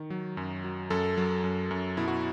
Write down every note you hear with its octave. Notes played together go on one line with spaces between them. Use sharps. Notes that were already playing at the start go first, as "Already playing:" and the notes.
Already playing: D#3
F#3
F#2
F#3
F#2 A4
F#3
F#2
F#2
B2 E4
F#4